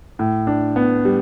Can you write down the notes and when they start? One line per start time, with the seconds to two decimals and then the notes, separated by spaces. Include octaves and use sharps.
0.19 A2
0.47 D4
0.76 B3
1.05 G3